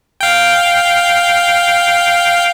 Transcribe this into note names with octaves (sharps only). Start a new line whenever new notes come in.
F5 G5